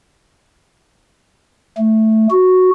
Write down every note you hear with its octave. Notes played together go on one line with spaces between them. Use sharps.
A3
F#4